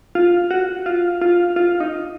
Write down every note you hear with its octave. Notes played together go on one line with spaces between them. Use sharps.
F4
F#4
F4
F4
F4
D#4